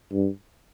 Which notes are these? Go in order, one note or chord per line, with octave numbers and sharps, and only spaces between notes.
G2